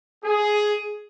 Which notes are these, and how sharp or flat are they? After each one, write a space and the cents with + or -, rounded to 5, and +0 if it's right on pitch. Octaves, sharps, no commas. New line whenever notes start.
G#4 +10